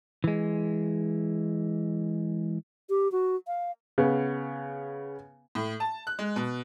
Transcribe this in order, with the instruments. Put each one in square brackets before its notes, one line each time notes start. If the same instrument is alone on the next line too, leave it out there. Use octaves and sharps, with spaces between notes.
[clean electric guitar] E3 G#3
[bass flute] G4
F#4
F5
[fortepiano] C#3 B3
[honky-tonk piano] A2
A5
F#6
G#3
B2